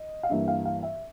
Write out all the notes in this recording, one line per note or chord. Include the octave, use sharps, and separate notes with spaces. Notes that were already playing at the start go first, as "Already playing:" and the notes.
Already playing: D#5
F5
G2 E3 G3 A#3 E5
F5
F5
E5